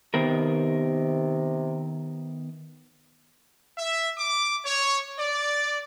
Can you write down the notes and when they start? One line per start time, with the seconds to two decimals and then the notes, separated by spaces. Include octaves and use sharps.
0.14 C3 D#3 B3 A#4
3.79 E5
4.18 D6
4.66 C#5
5.19 D5